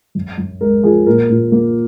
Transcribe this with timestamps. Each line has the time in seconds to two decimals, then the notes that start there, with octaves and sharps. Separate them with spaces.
0.15 F#2
0.38 F#2
0.61 G#3 A#4
0.84 F3 G#4
1.06 A#2 A#4
1.30 A#2
1.52 A#3